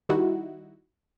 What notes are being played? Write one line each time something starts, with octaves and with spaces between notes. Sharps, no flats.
D#3 G3 D#4 E4 F#4